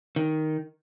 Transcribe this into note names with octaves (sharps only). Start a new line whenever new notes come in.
D#3